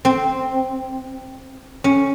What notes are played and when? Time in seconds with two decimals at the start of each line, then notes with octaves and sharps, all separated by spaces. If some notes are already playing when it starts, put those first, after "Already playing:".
0.05 C4
1.84 C#4